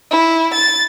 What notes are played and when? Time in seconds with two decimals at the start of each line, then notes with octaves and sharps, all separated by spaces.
0.11 E4
0.54 A6